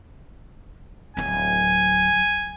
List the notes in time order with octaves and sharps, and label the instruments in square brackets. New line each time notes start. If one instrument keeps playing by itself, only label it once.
[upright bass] D1 F#3 [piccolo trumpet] G#5